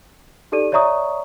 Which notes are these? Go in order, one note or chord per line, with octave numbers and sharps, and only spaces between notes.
D#4 G4 A4 D5 D#7
C#5 D5 E5 A#5 C#6 D#6